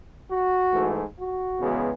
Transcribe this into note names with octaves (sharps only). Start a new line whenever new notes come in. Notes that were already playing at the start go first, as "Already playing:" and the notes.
F#4
G#2 E3 A3
F#4
E2 C#3 G#3 B3